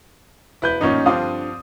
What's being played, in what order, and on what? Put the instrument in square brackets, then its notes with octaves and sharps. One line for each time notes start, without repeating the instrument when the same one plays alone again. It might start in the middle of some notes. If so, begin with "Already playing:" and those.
[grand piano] E1 B4 G6 [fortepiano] E4
[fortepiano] A1 F#2 A#2 [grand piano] C#4 D#4
[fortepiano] G2 D3 F3 [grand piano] C4 F5 D#6